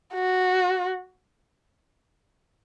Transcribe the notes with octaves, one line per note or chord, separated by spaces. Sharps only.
F#4